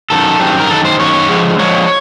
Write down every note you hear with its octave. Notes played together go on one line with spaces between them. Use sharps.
F#2 D#3 A4
F#2 D#3 G3 C4
A#4
F#2 D#3 A4
C5
F#2 D#3 C#5
D3 F3 G#3
D3 F3 G#3 C#5